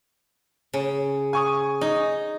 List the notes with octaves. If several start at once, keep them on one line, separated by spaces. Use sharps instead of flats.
C#3
G#5 C#6 D#6
D#4 D#5